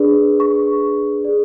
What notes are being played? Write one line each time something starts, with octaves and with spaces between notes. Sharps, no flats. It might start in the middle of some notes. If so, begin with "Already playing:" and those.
Already playing: D4 G#4 B4 D5
C#6
G#4 D5